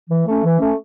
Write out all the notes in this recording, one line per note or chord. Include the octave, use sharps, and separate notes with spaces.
E3
A3 C#4
E3
A3 C#4